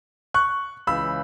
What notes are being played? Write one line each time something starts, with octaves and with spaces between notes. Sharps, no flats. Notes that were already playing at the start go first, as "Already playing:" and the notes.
C#6 F#6
C#2 C#3 E3 B5 E6